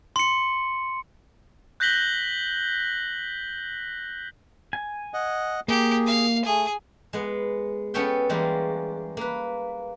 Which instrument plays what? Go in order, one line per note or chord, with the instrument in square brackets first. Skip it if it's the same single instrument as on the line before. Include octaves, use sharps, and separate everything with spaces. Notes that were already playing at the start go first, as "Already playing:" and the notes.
[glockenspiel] C6 C#7
[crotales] F#6 G6 A#6 B6 F#7 G7
[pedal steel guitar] G#5
[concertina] D#5 F#5
[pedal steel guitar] A#3 [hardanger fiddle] G4 [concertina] G#4
[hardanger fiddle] F5
[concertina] A3 [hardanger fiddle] G#4
[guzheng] G#3 B3
B3 C#4 A4 C#5 E5 G5
E3 G3 G#3 A#3 F4
A#3 B4